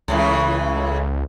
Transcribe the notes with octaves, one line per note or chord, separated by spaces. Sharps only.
C#2 A2 C#3 E3